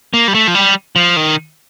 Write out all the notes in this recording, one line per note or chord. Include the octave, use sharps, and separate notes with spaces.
A#3
G3
A3
F3
G3
F3
D#3